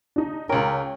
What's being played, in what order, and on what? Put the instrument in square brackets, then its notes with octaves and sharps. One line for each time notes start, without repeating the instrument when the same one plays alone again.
[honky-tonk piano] D4 D#4
[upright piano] C#2 A#4 [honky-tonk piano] C#5 G5